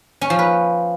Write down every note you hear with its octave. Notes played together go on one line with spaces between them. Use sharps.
C#4
F3
B4